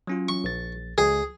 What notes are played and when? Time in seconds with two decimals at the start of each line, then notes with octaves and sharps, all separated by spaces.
0.07 F#3 C#4 F4
0.29 C#6
0.44 A#1 A6
0.98 C#2 G#4